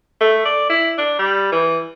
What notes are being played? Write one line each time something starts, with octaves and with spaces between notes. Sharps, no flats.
A3
D5
E4
D4
G3
E3